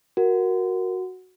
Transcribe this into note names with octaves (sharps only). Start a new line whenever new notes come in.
F#4 A#4